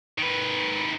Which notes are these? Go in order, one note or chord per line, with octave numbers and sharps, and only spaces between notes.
D#3 B4